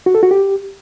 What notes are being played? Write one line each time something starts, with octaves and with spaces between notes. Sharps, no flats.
F#4
A4
F#4
G4